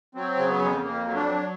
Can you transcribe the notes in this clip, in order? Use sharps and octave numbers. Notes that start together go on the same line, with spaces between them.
F#3 C4
C#3
B3
F2
F2 A#3
F#3
D4
F#3